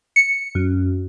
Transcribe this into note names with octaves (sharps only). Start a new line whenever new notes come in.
C#7
F#2